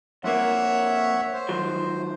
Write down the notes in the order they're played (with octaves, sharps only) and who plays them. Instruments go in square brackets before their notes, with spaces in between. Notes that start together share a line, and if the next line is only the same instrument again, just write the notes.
[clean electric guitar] F2 A#3 [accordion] C#5 E5 F#5
[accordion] C5
[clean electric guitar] D#3 F3 F#3